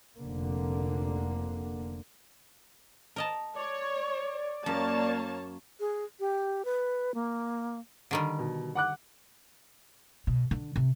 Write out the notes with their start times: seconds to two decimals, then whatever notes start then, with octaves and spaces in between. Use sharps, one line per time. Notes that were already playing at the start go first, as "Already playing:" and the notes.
0.19 F1 D3 A#3
3.16 A#4 D#5 A5
3.56 C#5 D5
4.66 F#2 A#3 C#5 A5
5.80 G#4
6.20 G4
6.65 B4
7.14 A#3
8.11 D3 D#3 G3
8.39 B2
8.75 F#5 D6 F#6
10.27 B2
10.51 D3
10.76 C3